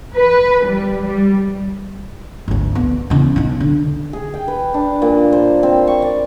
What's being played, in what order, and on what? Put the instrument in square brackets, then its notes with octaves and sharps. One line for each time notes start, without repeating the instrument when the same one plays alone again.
[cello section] B4
G3
G3
[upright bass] G#1 D2
B3
E2 C#3
B1 D#4
D3
[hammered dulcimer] G#4
G5
B4
D4
A#2
C5
C4
C#6
D5